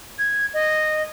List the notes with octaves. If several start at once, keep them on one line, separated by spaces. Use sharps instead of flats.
G#6
D#5